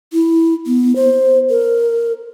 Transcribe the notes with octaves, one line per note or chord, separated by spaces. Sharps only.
E4
B3
C5
A#4